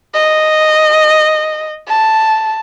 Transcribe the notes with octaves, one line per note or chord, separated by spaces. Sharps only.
D#5
A5